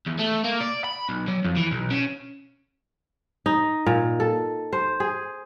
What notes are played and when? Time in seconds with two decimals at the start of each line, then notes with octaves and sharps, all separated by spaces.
0.06 E2
0.19 A3
0.44 A#3
0.61 D5
0.84 B5
1.09 B1
1.28 F#3
1.45 F2
1.56 E3
1.71 B1
1.90 C#3
3.46 D#4
3.86 A#2
4.20 A4
4.73 C5
5.00 G#4